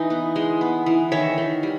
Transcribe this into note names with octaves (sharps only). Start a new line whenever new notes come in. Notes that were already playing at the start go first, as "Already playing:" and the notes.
Already playing: E3 D#4
B3
G#3
B3
E3
D#3 C#5 E5
D#3
G3